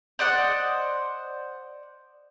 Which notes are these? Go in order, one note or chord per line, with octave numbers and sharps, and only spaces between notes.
C5 D5 D#5 F#5